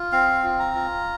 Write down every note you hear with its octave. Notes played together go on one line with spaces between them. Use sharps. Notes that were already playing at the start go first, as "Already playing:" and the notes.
Already playing: F4
C4 F5
F4
A#5
F4